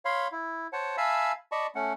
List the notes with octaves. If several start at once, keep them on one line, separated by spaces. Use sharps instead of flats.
C#5 F5 B5 C6
E4
C5 C#5 F#5 A5
E5 F5 G#5 A5 B5 E6
D5 D#5 A5 B5 C#6
A3 C#4 F#5